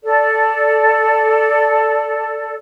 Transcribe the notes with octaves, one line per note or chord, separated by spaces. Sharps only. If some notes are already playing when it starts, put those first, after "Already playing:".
A4 D5